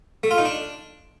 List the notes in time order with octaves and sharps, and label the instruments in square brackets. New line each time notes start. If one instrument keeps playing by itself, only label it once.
[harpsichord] A3
F4
D#4
D4